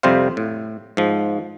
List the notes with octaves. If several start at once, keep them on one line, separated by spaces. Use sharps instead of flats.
F2 C3 G3 C5 F5
A2
G#2 F3